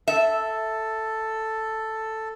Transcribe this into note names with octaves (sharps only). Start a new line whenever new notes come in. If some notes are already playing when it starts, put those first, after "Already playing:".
A4 E5